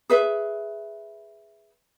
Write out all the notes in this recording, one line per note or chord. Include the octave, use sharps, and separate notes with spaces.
G#4 B4 E5